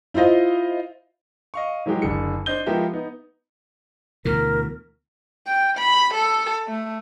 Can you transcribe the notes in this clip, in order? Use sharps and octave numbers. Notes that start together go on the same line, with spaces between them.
E4 F4 C5 D#5 F5
D#5 F5 C#6
E3 F#3 G#3 G4 G#4
F#1 D3 G#4 C#7
D4 C5 D#5 G6 G7
F3 G#3 B3 G4 A#4 E5
B3 D#4
D2 B2 E3 A#4
G5
B5
A4
A3